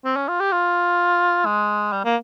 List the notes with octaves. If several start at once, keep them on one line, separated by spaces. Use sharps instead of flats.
C4
C#4
F4
G4
F4
G#3
G3
A#3